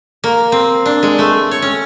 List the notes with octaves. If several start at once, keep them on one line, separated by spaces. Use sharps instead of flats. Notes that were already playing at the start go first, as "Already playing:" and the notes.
A#3
C4
D4
G#3
A3
C#5
C#4